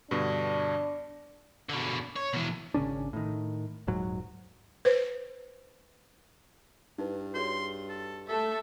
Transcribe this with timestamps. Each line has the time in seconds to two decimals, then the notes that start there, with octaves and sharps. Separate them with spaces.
0.11 G2 B2 D3 D4
1.69 B2 D3
2.16 C#5
2.33 B2 E3
2.74 G#1 C#3 C#4 D4
3.13 A2 D#3
3.87 D#1 G#2 F#3
4.85 B4 C5
6.99 G2 D#4 E4 B4
7.35 F#4 G#4 C#5 C6
7.89 A4
8.28 A3 A4 E5